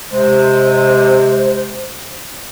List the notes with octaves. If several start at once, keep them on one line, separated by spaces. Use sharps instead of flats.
C3 G#3 C5